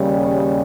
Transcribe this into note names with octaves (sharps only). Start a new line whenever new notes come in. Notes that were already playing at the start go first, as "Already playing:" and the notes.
Already playing: D#2 C#3 G3